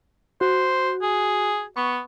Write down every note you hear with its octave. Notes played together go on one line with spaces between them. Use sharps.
F#4 C5
G#4
B3 C#6